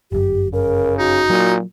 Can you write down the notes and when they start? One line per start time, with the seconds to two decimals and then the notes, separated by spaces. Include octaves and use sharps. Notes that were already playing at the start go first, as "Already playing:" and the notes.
0.12 G1 F#2 G4
0.53 C#3 A#4
0.99 D#4 F#4
1.30 A#2 F#3